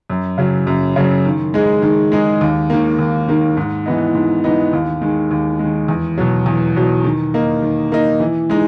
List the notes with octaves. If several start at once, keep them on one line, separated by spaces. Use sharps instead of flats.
F#2
C#3 F#3
F#2
C#3 F#3
D#3
G#3 D#4 G#4
D#3
G#3 D#4 G#4
D#2
D#3 A#3
D#2
D#3 A#3
G#2
E3 B3 D#4
G#2
E3 B3 D#4
D#2
D#3 G#3
D#2
G#3
D#3
E2
B2 F#3
E2
B2 F#3
D#3
A#3 D#4
D#3
A#3 D#4
E3
G#3 D#4